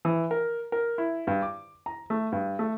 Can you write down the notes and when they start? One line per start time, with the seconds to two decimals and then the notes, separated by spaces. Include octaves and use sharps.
0.05 E3
0.31 A#4
0.72 A#4
0.98 E4
1.27 G2
1.42 D6
1.86 A#5
2.10 A3
2.32 G2
2.59 A3